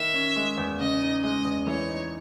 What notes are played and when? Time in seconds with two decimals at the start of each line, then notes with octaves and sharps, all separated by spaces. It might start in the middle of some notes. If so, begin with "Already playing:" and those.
Already playing: D#3 E5
0.14 C#4
0.36 G#3
0.58 E2
0.80 C#3 D#5
1.01 D#4
1.23 G#3 D#5
1.45 E2
1.67 E3 C#5
1.89 D#4